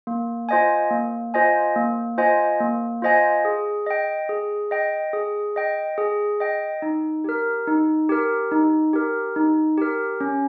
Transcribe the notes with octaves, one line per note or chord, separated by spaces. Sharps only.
A#3
F4 C5 D#5 G#5
A#3
F4 C5 D#5 G#5
A#3
F4 C5 D#5 G#5
A#3
F4 C5 D#5 G#5
G#4
D#5 G5
G#4
D#5 G5
G#4
D#5 G5
G#4
D#5 G5
D#4
G4 A#4
D#4
G4 A#4
D#4
G4 A#4
D#4
G4 A#4
C#4